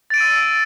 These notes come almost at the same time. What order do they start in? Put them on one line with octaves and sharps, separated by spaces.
A6 D7 D#7 E6